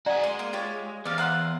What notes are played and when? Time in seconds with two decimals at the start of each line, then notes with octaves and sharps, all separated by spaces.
0.06 F#4 G#4 D5 F#5 A#5
0.23 G#3 C6
0.39 A#3
0.53 F4 G4 C#5
1.05 E2 C5 D5 F5
1.18 F5 F#5 A#5 C6